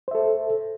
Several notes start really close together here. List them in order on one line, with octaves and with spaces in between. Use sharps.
C5 E5 A4